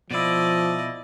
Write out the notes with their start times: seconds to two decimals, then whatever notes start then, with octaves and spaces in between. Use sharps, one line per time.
0.11 B2 F3 E4 D5 D#5